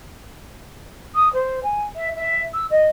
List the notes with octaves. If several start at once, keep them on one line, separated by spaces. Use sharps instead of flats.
D#6
C5
G#5
E5
E5
E6
D#5